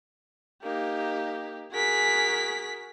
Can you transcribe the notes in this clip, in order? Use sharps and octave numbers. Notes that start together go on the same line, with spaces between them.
A#3 D#4 G4
F#4 G#4 A#4 B6